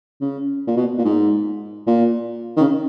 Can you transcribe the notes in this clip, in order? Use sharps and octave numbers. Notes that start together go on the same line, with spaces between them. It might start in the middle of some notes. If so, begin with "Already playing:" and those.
C#3
A#2
B2
A#2
G#2
A#2
D#3
C#3